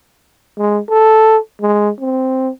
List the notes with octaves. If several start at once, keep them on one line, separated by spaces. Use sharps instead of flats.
G#3
A4
G#3
C4